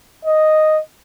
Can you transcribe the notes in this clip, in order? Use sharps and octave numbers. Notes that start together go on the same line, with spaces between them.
D#5